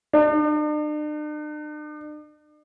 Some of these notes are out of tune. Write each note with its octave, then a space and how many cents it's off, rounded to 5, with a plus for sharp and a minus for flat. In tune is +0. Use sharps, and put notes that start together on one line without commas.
D4 +45